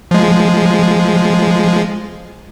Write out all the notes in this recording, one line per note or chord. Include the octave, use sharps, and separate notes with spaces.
F3 G#3